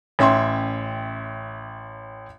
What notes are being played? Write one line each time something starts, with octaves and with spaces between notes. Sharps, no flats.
A1 C#4 E5 G5 C6